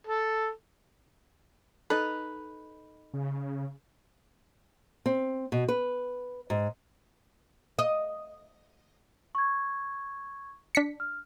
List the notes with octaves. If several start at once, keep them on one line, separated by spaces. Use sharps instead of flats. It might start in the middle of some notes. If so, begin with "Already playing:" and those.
A4
D#4 A4 B4
C#3
C4
B2
B4
G#2
D#5
C#6 G#6
D4 B6 C#7
F6